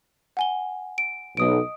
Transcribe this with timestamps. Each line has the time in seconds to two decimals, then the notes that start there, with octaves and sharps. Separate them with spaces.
0.37 F#5 G#5 G7
0.98 D7
1.37 B1 D#5 D#6 D7